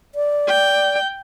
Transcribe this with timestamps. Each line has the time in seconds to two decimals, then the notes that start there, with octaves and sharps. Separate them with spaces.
0.15 D5
0.48 G5